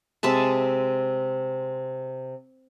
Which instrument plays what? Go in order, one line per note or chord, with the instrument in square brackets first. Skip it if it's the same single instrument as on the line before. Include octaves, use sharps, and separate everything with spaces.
[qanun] C3 G#3 E5 A5